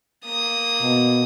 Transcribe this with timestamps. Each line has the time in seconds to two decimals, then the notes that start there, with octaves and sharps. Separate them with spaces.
0.25 A#3 D#6
0.81 B2